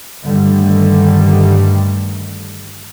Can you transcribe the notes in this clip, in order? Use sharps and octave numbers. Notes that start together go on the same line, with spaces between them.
G2 D3 D#3 G3 A3